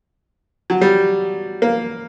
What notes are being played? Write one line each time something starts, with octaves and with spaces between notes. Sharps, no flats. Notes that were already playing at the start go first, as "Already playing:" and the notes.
F#3
G3
A#3